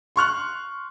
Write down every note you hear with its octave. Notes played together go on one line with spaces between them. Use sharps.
C6 C#6 F6 F#6